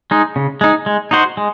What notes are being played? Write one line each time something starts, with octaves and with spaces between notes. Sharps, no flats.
G#3 D#4
C#3
G#3 D#4
G#3
D#4 F#4 C5
G#3